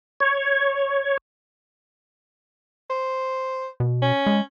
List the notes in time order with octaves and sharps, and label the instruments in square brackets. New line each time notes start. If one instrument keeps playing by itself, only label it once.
[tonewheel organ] C#5
[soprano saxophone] C5
[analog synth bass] B2
[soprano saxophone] C#4
[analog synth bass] G#3